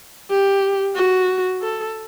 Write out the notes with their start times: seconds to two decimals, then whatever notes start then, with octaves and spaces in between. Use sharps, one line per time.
0.30 G4
0.96 F#4
1.62 A4